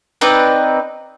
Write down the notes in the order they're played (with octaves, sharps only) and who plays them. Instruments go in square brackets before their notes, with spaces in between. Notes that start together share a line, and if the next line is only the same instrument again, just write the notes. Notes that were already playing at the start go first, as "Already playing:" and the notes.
[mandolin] C4 D#4 B4 D5